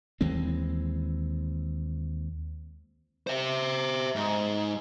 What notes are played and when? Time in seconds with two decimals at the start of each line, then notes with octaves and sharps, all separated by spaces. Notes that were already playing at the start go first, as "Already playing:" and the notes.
0.21 D#2 E3 G#3 C4
3.27 C5 E5
4.16 G#2